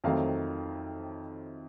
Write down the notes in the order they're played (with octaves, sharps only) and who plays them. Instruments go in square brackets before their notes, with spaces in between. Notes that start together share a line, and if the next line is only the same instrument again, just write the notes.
[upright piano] F2 D#3 F#3 A3 C4 F5